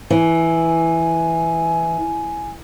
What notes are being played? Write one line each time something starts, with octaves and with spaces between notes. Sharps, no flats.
E3 G#5